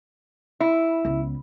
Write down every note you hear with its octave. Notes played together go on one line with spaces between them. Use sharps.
E4
C#2 B3